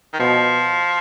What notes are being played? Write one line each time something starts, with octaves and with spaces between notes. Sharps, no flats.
D#3
B2 F3